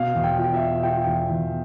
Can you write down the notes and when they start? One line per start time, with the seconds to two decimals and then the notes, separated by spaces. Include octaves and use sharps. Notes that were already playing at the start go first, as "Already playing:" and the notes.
Already playing: B2 F5
0.15 E2
0.23 G5
0.38 F4
0.53 E5
0.61 B2
0.83 F4 G5
1.06 E2
1.29 E2